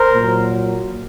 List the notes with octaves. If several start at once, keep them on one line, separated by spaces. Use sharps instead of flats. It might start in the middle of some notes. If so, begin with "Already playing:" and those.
Already playing: A#4 C5
A#2 F#3